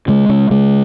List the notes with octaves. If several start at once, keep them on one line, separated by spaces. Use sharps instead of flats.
C#3 G#3
C#3
C#3 G#3